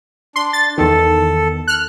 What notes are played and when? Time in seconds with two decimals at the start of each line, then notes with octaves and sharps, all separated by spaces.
0.36 D4 C6
0.53 A6
0.78 E2 D#3 A4
1.67 F6 F#6